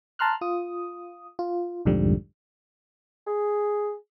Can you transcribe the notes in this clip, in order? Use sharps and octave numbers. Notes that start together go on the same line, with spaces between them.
A5 A#5 C6 F6 F#6
F4 D#6
F4
B1 F2 G#2 D3 F3 G3
G#4